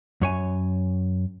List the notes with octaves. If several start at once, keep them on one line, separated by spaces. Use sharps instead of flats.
F#2 C#5 G#5